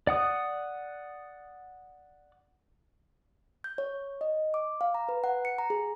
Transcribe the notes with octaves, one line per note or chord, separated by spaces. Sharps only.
D5 F#5 D#6
G6
C#5
D#5
D6
F5
A#5
B4
F#5
C#7
A#5
G#4